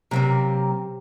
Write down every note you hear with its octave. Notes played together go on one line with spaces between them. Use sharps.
C3 F#3 A#3 C4 A#4